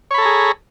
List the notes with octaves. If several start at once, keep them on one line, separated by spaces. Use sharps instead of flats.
G#4 A4 C#5 A#5 B5